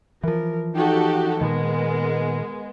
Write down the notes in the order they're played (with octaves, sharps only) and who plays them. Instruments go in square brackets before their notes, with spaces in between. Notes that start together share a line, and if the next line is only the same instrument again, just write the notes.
[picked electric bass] E3 F3 [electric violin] A#4
[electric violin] D#4 [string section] F#4 G4 A4
[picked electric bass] A#2 D#3 [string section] G#3 B3 [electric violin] A#4